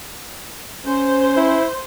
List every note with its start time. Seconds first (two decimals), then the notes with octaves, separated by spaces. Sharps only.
0.85 C#4 C5
1.37 E4